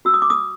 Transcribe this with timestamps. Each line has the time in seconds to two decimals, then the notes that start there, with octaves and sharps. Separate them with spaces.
0.05 F#4 E6
0.14 D#6
0.22 D6
0.30 D#6